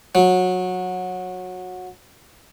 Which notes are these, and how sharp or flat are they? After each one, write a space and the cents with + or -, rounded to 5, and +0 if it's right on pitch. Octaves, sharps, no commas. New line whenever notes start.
F#3 -20